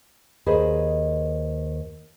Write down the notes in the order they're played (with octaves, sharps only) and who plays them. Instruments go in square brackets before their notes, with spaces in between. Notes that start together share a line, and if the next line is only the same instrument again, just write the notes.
[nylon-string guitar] D#2 G#4 B4 C5 D#5